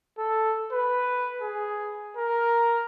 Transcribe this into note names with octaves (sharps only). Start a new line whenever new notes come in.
A4
B4
G#4
A#4